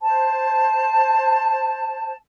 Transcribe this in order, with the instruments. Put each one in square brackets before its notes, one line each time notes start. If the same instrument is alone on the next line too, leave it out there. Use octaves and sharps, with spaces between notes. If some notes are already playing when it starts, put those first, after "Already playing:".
[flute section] C5 A5